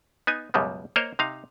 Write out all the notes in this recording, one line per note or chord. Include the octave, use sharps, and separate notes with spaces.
B3 D#4 G#5
C#2 F#2 B2 G3 G#3
A#3 A#4 C5 C#5 D#5
C3 D#4 F5